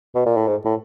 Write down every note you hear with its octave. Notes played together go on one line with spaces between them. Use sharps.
B2
A#2
A2
G#2
A2